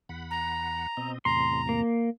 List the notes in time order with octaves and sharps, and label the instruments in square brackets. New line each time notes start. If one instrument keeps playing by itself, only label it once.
[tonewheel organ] E2 F#5 B5
[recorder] A#5
[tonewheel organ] B2 C4 D#5
[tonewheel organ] E2 A2 C3 [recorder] A#5 [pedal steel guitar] C6
[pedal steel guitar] A#3